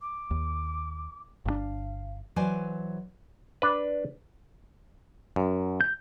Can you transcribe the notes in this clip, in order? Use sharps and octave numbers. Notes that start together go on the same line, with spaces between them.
D6
D#2
G1 B2 D4 F5
E3 F#3 C5 D5 G#5
D4 B4
F#2
G6